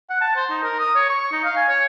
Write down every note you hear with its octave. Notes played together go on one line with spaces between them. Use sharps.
F#5
A5
C5
D#4
A#4
D#6
C#5
C#6
D#4
F5
G#5
C#5